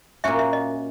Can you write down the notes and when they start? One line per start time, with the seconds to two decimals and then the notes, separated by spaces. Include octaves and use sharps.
0.24 A#2 A#3 C#4 F#4 E5
0.39 E5
0.53 D#5